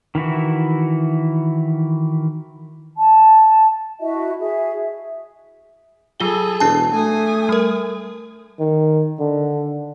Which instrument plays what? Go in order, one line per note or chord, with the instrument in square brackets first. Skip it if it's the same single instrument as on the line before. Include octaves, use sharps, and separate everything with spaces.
[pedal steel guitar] D#3 E3 E4 F#4
[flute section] A5
E4 F#4 D#5 E5
G#4 E5
[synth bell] F#3 F4 G7 [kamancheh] G#4 A4
[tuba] E1 [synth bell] D4 A5
[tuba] A3 [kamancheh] G#5 D#6
[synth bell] G3 A#4
[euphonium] D#3
D3